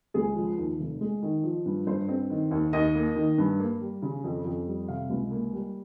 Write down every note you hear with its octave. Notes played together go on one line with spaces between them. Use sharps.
C#2 G#4
F3
D#2
F1
G#3
D#3
F3
G2
G2 C5
C4
D#3
D#2
D#2 D#5
A#3
D#3
G2
A#3
G3
C#3
F2
F2
G3
C3 F5
C#2
A#3
G3